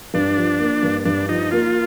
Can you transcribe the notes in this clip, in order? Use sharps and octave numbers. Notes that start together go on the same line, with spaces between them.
G2 D4
F3
A#3
G2
G2 D4
F3 D#4
A#3 F4